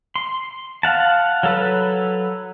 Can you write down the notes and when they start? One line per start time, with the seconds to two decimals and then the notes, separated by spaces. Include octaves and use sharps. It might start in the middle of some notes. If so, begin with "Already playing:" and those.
0.16 C6
0.83 F5 F#5 A5
1.43 F#3 A4 B4